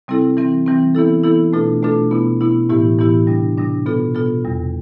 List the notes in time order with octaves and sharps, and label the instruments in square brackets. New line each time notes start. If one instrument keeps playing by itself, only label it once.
[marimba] C3 G3 C4 E4 A4
E3 G3 C4
E3 G3 C4
E3 B3 E4 A4
E3 B3 E4 A4
B2 A3 D4 F4 A4
B2 A3 D4 F4 A4
B2 B3 E4
B2 B3 E4
A2 E3 B3 E4 G4
A2 E3 B3 E4 G4
C3 G3 D4
C3 G3 D4
B2 B3 F4 A4
B2 B3 F4 A4
E2 C3 G3